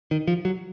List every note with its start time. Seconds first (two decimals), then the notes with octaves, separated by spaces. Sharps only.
0.11 D#3
0.27 F3
0.45 F#3